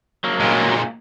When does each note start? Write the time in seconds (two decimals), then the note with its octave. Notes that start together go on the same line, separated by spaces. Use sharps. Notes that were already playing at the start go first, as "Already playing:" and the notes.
0.24 F#3 A#3
0.40 A#2 G#3